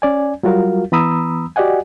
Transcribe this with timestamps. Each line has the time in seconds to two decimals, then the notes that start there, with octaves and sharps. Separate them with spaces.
0.02 C#4 D5 G#5
0.43 F#3 G3 F4 F#4 A#4 F5
0.92 E3 B3 A#5 B5 D#6 E6
1.56 F#4 G4 D5 D#5 F#5 G#5